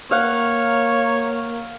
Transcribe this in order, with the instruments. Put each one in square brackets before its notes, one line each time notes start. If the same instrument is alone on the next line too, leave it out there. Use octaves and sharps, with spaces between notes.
[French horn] A#3 [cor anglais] C#5 [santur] F5 F#5